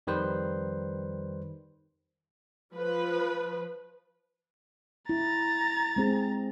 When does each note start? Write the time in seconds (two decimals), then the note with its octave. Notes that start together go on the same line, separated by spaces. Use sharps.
0.07 F2 D#3 G3 B4 C5
2.74 F3 B4
5.09 E4 A#5 A6
5.96 G#3 C4 G#4